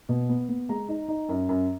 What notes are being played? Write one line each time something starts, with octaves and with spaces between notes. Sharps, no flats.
B2
B3
B3
G#3 A#5
D#4
D#4
F#2
F#2